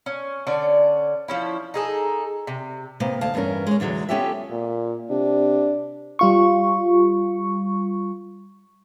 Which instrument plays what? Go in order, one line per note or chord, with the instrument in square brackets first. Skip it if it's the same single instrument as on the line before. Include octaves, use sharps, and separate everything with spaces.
[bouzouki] C#4
D3 C#4 D5
F3 C#4 E4
D#4 G#4 A4
C3
[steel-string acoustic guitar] C3 A#3 B3
D2 F5 A5
E2 G2 B3 C#4 A#4
G#3 C#5
E2 D3 F#3 G#3
B3 C#4 F4 G4 A4 E5
[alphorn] A#2
[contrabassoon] C3 [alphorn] D4
[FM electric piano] G3 F4 C#6